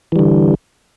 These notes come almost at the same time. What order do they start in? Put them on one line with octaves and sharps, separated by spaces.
E3 G3 D3